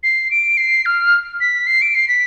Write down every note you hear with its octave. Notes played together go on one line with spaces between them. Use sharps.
C7
D7
C7
F6
B6
C7
D7
C7
B6